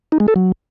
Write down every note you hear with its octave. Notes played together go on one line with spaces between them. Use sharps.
D#4
G#3
A4
F#3